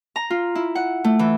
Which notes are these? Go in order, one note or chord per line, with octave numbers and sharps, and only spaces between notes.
A#5
F4
E4
F#5
A3
E3